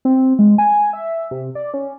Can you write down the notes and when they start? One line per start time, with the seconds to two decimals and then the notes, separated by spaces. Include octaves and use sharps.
0.05 C4
0.39 G#3
0.58 G#5
0.93 E5
1.31 C3
1.55 D5
1.74 C#4